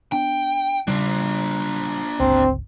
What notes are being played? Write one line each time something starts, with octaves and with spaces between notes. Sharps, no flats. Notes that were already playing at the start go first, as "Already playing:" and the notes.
B3 D4 G5
C#3 G3 D4 F4
G1 C#2 C4